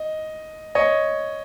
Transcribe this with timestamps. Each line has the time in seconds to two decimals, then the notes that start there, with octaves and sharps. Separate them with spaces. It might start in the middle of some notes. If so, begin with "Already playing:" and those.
Already playing: D#5
0.75 C#5 D#5